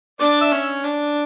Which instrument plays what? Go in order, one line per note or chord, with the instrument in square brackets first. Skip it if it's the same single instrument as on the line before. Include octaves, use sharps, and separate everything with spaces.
[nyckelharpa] D4 [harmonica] D5
[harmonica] E5
[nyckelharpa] C#4
D4